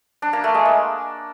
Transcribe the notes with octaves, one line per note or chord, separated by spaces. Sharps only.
D4
A#3
A3
G#3
A#3